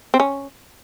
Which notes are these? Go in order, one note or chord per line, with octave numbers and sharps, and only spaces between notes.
C4
C#4